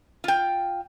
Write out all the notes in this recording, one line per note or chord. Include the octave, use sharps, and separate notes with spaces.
F4 G5